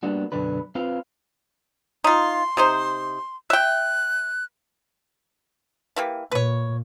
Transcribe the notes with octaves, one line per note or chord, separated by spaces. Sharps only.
G3 A#3 B3 D4 F#4
B1 F#2 D3 D4 B4
C4 F4 B4 F5
D#4 F4 C6
C3 D#4 C5
E5 G5 F#6
E3 A#3 G4
A#2 B4 C#5